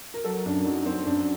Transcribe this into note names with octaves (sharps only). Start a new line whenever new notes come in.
A#4
F#3 A4
F#2 D4
F#3 D#4
F#3 C4
F#2 D4